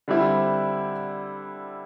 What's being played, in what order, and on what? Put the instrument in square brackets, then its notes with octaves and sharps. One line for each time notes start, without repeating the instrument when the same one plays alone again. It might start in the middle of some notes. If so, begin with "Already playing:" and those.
[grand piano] D3 G3 C4 E4